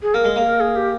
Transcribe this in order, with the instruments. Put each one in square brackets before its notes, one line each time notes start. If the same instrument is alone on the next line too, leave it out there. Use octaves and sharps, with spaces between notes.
[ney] G#4
[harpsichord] A#3 [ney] A#4
[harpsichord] G#3
[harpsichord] A#3 [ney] G#4
[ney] A#4
G#4
G4